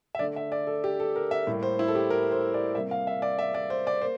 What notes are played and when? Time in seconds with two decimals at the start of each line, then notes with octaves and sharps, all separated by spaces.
0.15 E5
0.19 D3 A3 D5
0.36 E5
0.52 D5
0.67 A4
0.84 G4
1.00 A4
1.16 A#4
1.31 E5
1.47 A2 G3 A#3
1.63 C5
1.79 E4
1.88 A4
1.95 G4
2.10 A#4
2.32 C5
2.54 D5
2.75 C3 G3 A#3 E5
2.91 F5
3.07 E5
3.22 D5
3.39 E5
3.54 D5
3.70 C5
3.87 D5
4.02 A#3 C5